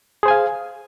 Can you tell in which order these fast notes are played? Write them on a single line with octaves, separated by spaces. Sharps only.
G#4 C5 G#5 F5